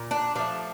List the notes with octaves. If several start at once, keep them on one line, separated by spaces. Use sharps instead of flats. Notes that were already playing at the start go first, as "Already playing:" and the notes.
Already playing: A#2
D4
F3 A3 D4